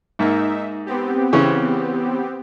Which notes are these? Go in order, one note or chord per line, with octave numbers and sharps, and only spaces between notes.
G#2 A#3 D#4 E5
B3 C4 G4
C#3 E3 C#4